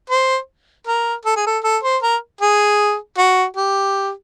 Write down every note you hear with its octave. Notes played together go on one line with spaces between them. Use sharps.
C5
A#4
A4
G#4
A4
A4
C5
A#4
G#4
F#4
G4